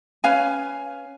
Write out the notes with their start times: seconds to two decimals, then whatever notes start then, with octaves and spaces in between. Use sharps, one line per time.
0.24 C#4 B4 F5 G#5